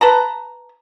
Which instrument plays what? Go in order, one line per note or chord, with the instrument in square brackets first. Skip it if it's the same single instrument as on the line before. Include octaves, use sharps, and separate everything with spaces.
[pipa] B4 A5 A#5